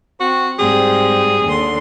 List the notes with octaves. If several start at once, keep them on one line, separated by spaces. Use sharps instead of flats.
C4 F#4
G#2 G3 C4 G#4
D#2 D3 C6